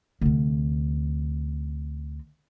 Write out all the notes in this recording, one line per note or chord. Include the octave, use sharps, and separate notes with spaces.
D2 C3